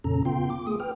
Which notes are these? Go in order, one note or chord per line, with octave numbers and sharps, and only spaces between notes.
F2 A#2 C#3 C#4 A4 A#5
C#3 B3 F4 G5 C6
D6
A3 G#4 D#6
B4 G5 F6